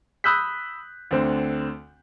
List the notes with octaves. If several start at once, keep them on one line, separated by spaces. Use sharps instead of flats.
B5 D#6 E6 F#6 G6 B6
D2 D3 C4